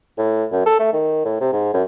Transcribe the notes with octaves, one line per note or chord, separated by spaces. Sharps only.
A2
F#2
A4
A3
D#3
A2
C3
G#2
F#2